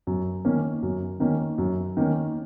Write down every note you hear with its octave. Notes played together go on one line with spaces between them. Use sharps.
F#2
D#3 A#3 C#4
F#2
D#3 A#3 C#4
F#2
D#3 A#3 C#4